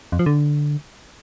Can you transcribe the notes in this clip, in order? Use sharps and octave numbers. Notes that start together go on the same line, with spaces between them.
F2
F3
D3